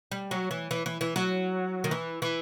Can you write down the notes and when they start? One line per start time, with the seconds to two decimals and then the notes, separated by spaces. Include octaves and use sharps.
0.12 G3
0.31 F#3
0.51 E3
0.71 E3
0.86 E3
1.01 E3
1.16 F#3
1.84 D#3
1.91 E3
2.22 E3